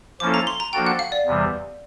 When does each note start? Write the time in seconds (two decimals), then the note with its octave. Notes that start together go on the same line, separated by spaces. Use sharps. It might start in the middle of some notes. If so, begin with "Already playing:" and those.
0.20 F3 A#3 C#4 E4 A4 D6
0.34 A#5
0.47 C6
0.60 A#5
0.73 F3 A#3 D4 F#4 A4 G5
0.87 F#5
0.99 F5
1.12 D5
1.26 E2 C3 E3 G3